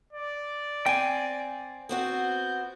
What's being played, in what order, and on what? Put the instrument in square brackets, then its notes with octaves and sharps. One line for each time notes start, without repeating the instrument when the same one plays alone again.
[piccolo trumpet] D5
[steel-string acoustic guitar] C4 [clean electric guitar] G5 G#5
[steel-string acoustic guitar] B3 C4 F#4 [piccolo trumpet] G6